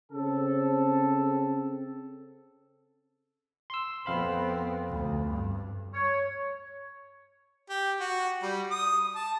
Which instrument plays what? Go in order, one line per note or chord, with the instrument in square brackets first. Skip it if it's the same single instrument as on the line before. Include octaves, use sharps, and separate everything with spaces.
[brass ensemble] C#3 C4 A4
[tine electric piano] C6 E6
[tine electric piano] F2 F5 B5 [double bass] B3 C4
[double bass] D2
G2
[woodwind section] C#5
[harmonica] G4
F#4
G3
D#6
A5